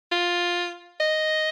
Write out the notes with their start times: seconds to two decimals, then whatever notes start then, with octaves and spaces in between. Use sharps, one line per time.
0.12 F4
1.00 D#5